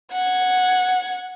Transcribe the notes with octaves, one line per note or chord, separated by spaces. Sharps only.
F#5 G#6